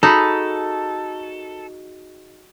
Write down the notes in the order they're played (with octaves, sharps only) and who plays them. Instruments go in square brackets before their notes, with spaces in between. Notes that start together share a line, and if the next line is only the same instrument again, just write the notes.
[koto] D#4 [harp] F#4 G#4 B5 [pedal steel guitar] A4